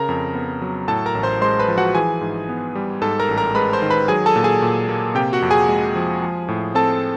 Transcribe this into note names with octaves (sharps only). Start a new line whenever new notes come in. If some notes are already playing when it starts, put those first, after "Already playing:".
Already playing: C#3 A#4 A#5
F2
B3
F#3
A2 A4 A5
A#4 A#5
A1
C5 C6
G#3 C5 C6
B4 B5
F3
F#4 F#5
E3 G#4 G#5
G#2
B3
G3
G#2 A4 A5
A#4 A#5
A1
A#4 A#5
G#3 B4 B5
C5 C6
D#3
B4 B5
F#3 G#4 G#5
A4 A5
A#2
G#4 G#5
A#2
A#3
C3 G4 G5
F#4 F#5
F2
G#4 G#5
G#3
F3
F3
A2
C4 A4 A5